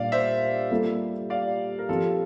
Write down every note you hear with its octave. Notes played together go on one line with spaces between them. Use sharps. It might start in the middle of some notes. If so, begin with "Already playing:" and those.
Already playing: A#2 G3 D4 D5 F5
C5 E5
G3 A#3 F4 A4
D5 F5
A#4
F3 C4 F4 G4 A4